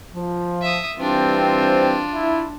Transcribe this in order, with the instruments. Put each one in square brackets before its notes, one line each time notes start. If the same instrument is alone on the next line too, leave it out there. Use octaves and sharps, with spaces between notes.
[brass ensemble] F3
[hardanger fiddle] E5 D#6
[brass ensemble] E3 G3 C4 [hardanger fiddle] D4 F4
[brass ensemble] E4